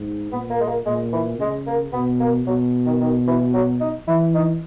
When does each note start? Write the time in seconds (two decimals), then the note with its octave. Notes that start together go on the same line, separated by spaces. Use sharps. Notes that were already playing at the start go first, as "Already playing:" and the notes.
Already playing: G#2
0.32 A#2 B3
0.50 A#3
0.60 G#3
0.68 A#3
0.85 A#2 G#3
1.13 E3
1.39 C#3 G#3
1.67 A#3
1.92 B2 B3
2.20 A#3
2.46 B2 F#3
2.86 D#3
3.00 D#3
3.27 E3
3.53 F#3
3.80 D#4
4.07 E3 E4
4.34 D#4